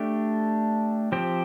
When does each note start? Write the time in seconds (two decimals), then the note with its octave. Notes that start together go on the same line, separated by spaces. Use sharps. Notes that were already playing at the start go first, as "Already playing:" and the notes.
Already playing: A3 D4 G4
1.12 F3 C4 G4 C5